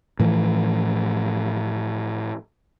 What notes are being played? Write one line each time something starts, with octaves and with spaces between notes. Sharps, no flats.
A2 E3 F3